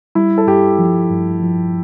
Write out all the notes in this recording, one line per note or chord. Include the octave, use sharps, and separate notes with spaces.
G3 E4
A4
G2 G4
F3
G2
F3